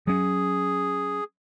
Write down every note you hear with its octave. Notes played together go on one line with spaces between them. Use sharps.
F#3 C#4 G#4